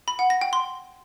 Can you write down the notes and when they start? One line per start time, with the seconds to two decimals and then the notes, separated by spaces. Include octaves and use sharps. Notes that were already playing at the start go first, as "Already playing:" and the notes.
0.08 B5
0.19 F#5
0.30 A#6
0.41 G5
0.53 C6